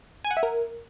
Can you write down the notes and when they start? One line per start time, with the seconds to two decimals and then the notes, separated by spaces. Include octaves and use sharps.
0.25 G#5
0.31 F#5
0.37 E5
0.43 A#4